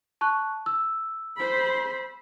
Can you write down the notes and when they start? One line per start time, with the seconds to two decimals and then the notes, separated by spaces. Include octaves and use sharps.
0.21 A5 C#6 F#6
0.66 E6
1.36 C5 B5